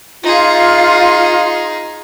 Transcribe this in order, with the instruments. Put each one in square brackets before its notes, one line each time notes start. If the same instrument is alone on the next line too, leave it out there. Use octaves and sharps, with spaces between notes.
[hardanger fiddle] D#4 G#4 [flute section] F4